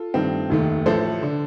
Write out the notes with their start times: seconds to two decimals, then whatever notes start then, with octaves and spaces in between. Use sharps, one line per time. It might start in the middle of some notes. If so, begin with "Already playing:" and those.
Already playing: F4 A4
0.14 G2 D#3 A3 C4
0.50 F1 D#2 D#3 A3
0.86 A1 A2 F3 A3 A4 C5
1.22 D3